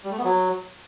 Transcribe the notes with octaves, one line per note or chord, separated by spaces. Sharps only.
G3
A3
B3
F#3